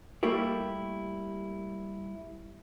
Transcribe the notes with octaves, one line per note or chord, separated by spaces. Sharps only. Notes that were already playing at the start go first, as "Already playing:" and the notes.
G3 A3 A#3 E4 G4